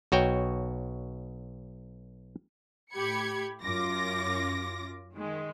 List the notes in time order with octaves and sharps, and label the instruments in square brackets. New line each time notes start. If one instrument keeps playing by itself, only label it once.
[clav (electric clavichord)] B1 F#4 C#5 G5
[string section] A2 G4 B5 G#6 C#7
F#2 F4 D6 A#6
D#3 G#3